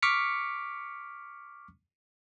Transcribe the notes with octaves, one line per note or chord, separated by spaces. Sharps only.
C#6 D6 F6 B6 C#7